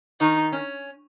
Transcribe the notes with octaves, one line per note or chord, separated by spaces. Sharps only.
D#3 D#4
C#4